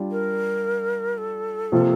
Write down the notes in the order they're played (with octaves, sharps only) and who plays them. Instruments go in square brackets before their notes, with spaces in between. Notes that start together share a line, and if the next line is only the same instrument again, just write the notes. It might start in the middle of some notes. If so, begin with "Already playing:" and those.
Already playing: [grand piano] G3 D4 F4
[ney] A#4
A4
[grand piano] C3 F3 A#3 F4